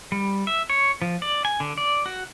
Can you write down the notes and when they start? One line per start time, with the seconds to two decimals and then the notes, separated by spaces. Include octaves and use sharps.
0.12 G3
0.47 E5
0.70 C#5
1.02 F3
1.22 D5
1.45 G#5
1.60 D3
1.78 D5
2.06 F#4